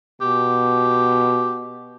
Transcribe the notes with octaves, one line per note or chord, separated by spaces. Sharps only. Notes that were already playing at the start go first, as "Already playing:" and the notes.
B2 G4